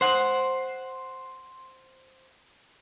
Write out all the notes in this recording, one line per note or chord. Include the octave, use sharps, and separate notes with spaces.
C5 F#5